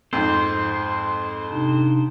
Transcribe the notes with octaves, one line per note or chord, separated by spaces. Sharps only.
F2 G#2 C5
C3 D4 D#4